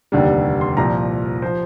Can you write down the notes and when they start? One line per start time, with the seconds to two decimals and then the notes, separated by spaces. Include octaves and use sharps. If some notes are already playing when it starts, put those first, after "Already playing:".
0.12 F1 D#2 D3 G3
0.61 C6
0.77 C2 A#2 F3 A#5
1.42 F3 C5